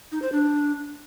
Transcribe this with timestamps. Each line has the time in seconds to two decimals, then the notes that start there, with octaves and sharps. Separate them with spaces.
0.12 D#4
0.22 C5
0.32 D4